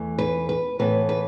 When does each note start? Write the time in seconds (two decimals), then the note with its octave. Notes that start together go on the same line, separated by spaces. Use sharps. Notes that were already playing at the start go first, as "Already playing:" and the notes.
Already playing: E2 E3 A3
0.19 B4
0.49 B4
0.79 A2 E3 B3 B4
1.09 B4